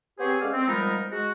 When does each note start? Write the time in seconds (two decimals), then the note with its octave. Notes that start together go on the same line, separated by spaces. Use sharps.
0.20 B3 C4 G4 G#4 C5 C#5
0.41 G#3 C#4 A4 D5 F5
0.53 C4
0.68 F3 G3 G#3 B3 D#4 A#4
1.12 G#3 F#4